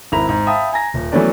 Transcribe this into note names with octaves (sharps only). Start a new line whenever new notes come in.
G#1 E4 A#5 B5 F7
G#2
E5 F5 G5 A5 B5 D#6
G#5 A#5 A#6
D#1
E3 F#3 A3 B3 C#4 D5